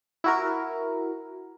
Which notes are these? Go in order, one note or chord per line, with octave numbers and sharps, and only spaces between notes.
E4 F#4 A#4